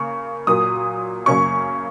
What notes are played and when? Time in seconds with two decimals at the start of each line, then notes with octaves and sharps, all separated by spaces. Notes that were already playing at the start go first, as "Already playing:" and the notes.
Already playing: C#3 A#3 C#6
0.47 A#2 F#3 A#3 D#6
1.26 F#2 C#3 A#3 C#4 C#6